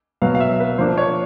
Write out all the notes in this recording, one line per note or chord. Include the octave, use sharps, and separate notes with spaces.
B2 F#3 B3 F5
F5
E5
B4
F3 A#3 D4 C5
C#5